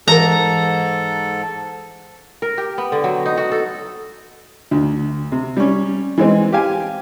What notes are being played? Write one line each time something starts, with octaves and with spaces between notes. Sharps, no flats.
G#2 E3 A4 A#4 A#5
A#4
G4
B3
D3
F#3
D#4
F#4
A4
D2
C3
G3 C#4
E3 G#3 C4
G4 F5 G#5